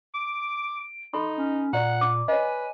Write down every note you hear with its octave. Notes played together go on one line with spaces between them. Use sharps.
D6 D7
D#4 A4 B5 C6
C#4
A#2 D5 F#5 A#5
D6
B4 C#5 D#5 G#5